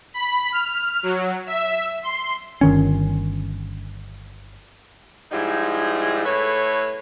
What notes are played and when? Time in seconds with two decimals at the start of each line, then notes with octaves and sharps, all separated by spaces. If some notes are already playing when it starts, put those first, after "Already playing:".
0.14 B5
0.52 F6
1.03 F#3
1.47 E5
2.03 C6
2.61 G1 D#3 C#4
5.31 G#2 F3 G3 D#4 E4 G#4
6.25 A2 A4 B4 C#5